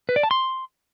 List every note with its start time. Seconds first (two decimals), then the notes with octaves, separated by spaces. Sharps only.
0.09 B4
0.16 D5
0.23 A5
0.31 C6